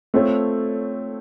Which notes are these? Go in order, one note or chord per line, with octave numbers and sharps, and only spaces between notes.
A3 C4 F4 A4 C#5